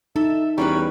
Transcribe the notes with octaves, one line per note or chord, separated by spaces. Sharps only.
D#4 A4 E5
E2 G3 C#4 A#4 B4 C#5 B5